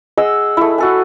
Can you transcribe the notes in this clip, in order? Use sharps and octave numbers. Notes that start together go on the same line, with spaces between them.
G#4 D#5 F#5 E6
A3 E4
F#4 A4 G#5